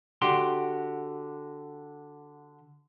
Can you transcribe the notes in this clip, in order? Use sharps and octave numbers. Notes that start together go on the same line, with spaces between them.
D3 F#4 G4 C6